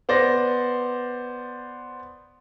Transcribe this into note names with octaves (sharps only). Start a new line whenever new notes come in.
B3 C5 D5 A#6